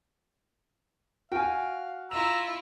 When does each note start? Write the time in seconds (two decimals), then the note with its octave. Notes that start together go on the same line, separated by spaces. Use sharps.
1.32 F#4 F5 G5 G#5
2.11 E4 F4 A#5 E6 F7